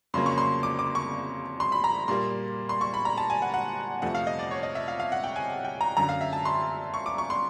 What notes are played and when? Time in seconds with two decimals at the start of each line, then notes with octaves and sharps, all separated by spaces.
0.14 F2 C#3 F#3 A#3 C6
0.26 C#6
0.38 C6
0.63 D6
0.79 D6
0.95 C#6
1.60 C6
1.72 B5
1.84 A#5
2.08 A#2 G3 A#3 C6
2.69 C6
2.81 C#6
2.94 B5
3.05 A#5
3.18 A5
3.30 G#5
3.42 F#5
3.54 F#5
4.02 F2 C3 F3 A3 F#5
4.15 F5
4.27 D#5
4.39 D5
4.51 C#5
4.63 D#5
4.75 E5
4.88 F5
5.00 F5
5.12 F#5
5.24 G5
5.36 G#5
5.65 G5
5.81 A#5
5.97 F#2 D3 F#3 A#5
6.09 F5
6.21 E5
6.33 A5
6.45 C6
6.94 C#6
7.06 D6
7.18 C#6
7.30 C6